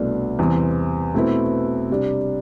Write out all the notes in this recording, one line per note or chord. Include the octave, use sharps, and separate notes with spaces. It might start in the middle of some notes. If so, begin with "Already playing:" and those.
Already playing: C2 B2 A3 D4
E2 C3 E3 G3 C4
B2 A3 C4 E4 B4
C3 G3 D4